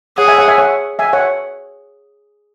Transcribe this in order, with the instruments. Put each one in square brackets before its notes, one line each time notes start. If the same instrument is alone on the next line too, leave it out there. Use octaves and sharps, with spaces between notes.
[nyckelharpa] G#4 [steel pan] C#5 F#5
[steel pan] E5 G#5
C#5 F#5
E5 G#5
C#5 F#5
E5 G#5
C#5 F#5